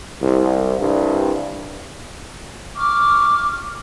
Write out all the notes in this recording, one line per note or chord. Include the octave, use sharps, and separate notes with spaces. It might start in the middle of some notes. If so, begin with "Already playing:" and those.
C2
C2 G2
C#6 D6 F6